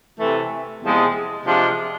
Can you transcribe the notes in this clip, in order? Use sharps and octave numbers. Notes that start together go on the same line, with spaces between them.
C3 E3 A3
E2 C3 F3 G#3
C3 F3 G#3 D4 F4